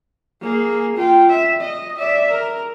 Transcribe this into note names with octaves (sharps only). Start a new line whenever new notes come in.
A#3 G#4
F4 G5
E5
D#5
D5 E5
A#4